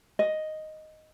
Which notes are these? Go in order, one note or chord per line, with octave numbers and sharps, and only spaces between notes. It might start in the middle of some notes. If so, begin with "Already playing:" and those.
D#5